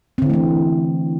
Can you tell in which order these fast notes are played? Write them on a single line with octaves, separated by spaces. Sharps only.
C4 D3 E4 A3 E3